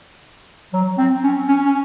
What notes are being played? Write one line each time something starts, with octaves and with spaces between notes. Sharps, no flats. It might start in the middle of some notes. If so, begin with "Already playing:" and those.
F#3
C4
C#4
C#4
C#4